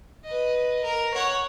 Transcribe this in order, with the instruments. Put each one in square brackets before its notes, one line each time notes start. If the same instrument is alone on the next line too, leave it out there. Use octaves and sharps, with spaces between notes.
[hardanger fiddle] B4 D#5
A#4
C#5 F#5